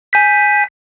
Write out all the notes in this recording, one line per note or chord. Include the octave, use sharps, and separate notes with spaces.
G#5 G6 B6